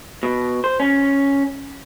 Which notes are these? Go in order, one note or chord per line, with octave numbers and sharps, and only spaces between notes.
B2
C5
C#4